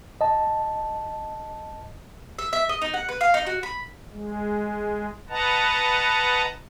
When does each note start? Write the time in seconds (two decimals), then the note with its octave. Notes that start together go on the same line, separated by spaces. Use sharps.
0.21 D#5 A5
2.39 E5
2.53 E5
2.69 D#5
2.82 D#4
2.94 F#5
3.09 B4
3.21 F5
3.34 D#4
3.46 F#4
3.63 B5
4.12 G#3
5.30 B4 D#5 F#5 A5 A#5